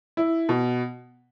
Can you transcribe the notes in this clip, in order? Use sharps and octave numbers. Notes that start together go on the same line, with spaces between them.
E4
B2